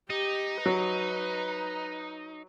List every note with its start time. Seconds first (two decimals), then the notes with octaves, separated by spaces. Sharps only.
0.10 D#4 G4
0.66 F#3 B4